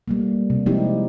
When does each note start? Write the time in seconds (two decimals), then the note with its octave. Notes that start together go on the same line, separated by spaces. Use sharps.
0.08 G3 A3 A#3
0.50 C3
0.66 F3 G#3 C4 D#4 E4 G4